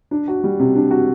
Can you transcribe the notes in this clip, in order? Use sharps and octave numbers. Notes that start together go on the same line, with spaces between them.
D4
F#4
G3
C3
D4
F#4